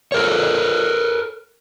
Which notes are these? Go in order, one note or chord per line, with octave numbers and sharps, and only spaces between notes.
A4 A#4 C#5